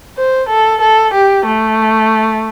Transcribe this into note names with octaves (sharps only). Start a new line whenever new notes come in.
C5
A4
A4
G4
A3